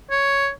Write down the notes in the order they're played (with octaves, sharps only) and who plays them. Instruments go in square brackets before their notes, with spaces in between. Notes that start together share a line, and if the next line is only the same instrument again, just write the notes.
[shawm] C#5